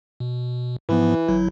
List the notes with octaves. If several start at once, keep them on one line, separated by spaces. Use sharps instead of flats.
B2
G#2 E3 F3 B3
G1 F#3 E4